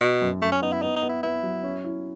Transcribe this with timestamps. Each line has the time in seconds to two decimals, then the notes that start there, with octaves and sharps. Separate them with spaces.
0.01 B2 F#4
0.22 F#2
0.42 F#2 A3
0.52 C#4
0.62 B3 D#4
0.72 E4
0.82 B3 D#4
0.96 D#4
1.03 B3
1.09 E4
1.23 B3 E4
1.43 F#3
1.63 C#4
1.84 E4